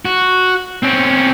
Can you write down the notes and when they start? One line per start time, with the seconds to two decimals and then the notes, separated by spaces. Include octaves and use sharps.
0.05 F#4
0.83 C4 C#4